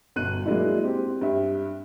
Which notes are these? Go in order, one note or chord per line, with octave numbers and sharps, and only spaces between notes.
G1 B2 F#6 D#7
F#3 G#3 A#3 D4 E4
C4 G4
G2 E5